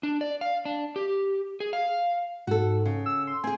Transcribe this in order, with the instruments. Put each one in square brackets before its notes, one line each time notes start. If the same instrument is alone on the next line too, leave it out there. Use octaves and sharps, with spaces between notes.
[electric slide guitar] D4
D5
F5
D4
G4
G#4
F5
[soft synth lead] G#2 [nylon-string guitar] F#4 A4
[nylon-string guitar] C#3
[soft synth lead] E6
C6
[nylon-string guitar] C4 G#4 [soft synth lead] G#5